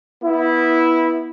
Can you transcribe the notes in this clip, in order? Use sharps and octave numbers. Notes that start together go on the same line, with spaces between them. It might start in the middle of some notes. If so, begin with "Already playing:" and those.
B3 E4